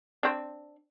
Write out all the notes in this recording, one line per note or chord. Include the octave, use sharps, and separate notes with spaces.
C4 D4